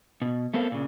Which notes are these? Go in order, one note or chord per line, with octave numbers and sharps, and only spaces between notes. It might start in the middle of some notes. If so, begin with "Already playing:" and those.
B2
A3 B3 C4 A4 A#4 F5
A#2 C#3